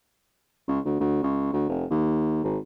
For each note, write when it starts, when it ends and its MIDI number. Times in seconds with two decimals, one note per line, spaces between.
0.68 0.79 37
0.85 0.97 38
1.00 1.19 38
1.23 1.49 37
1.53 1.67 38
1.69 1.85 29
1.90 2.43 39
2.43 2.58 32